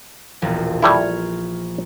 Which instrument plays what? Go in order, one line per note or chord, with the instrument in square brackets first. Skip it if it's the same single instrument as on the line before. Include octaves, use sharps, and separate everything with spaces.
[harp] E1 A#1 F3
[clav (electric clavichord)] G3 A3 E4 [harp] C#6 F6 G#6